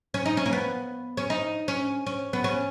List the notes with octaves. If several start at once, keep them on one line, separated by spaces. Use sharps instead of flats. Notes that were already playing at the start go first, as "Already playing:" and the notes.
C#4
D#4
C#4
A#3
B3
C#4
D#4
C#4
C#4
B3
C#4